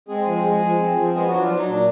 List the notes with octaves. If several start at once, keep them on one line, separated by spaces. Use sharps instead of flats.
G#3 C4 G#4
F3
G#3
F3
C4
F3
G#3 B3 G#4
F#3 D4 F#4
F3 F4
F#3
D#4
A#2 D4